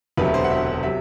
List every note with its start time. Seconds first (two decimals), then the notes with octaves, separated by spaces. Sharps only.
0.17 E1 D2 C3 F#3 A3 B4
0.34 C5
0.44 F#5
0.51 E5
0.83 C3 F#3 E5